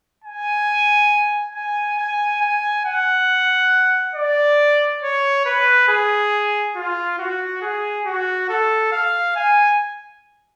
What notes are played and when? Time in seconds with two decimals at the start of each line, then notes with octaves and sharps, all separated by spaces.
0.24 G#5
1.55 G#5
1.98 G#5
2.41 G#5
2.85 F#5
4.15 D5
5.02 C#5
5.46 B4
5.88 G#4
6.76 F4
7.19 F#4
7.62 G#4
8.06 F#4
8.49 A4
8.92 F5
9.36 G#5